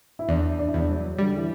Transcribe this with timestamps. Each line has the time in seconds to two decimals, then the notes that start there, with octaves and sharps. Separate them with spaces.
0.19 E4
0.29 E2 D4
0.59 D4
0.68 E4
0.74 E2 D4
0.89 F#3
1.18 D3 G3
1.37 E3